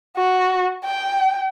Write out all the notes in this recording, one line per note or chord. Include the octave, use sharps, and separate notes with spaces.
F#4
G5